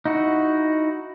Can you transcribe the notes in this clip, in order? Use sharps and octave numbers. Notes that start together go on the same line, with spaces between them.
D#4 E4 F#4